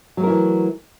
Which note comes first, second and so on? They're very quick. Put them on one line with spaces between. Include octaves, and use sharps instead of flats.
F#3 A3 A#4 E4 E3